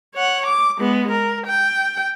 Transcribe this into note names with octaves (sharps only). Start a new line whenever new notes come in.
C#5 F#5
D6
G#3 B3
A#4
G5